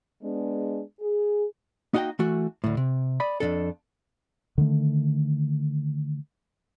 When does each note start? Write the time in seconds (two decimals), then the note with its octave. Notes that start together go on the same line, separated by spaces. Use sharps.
0.23 G#3 B3 D4
1.00 G#4
1.94 A#3 D#4 F#4 D#5 F5 G5
2.19 E3 A3 F#4
2.64 D2 A2
2.77 C3
3.20 D5 D#5 B5
3.40 F2 B2 D4 A4
4.58 D3 D#3 A3